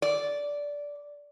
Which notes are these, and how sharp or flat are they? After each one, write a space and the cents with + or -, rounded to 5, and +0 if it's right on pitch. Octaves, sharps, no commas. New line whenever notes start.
D5 -10